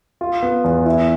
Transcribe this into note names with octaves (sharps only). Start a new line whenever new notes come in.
F4
B3
E2
E4